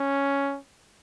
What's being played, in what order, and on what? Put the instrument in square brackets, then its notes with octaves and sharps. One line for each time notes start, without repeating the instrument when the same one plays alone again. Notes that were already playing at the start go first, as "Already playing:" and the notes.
Already playing: [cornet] C#4